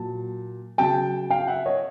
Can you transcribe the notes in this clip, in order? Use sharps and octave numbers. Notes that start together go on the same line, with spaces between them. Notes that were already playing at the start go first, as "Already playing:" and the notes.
Already playing: A#2 F#3 A5
C#3 F#3 G5 A5
F5 G5
E5 F#5
C#5 D#5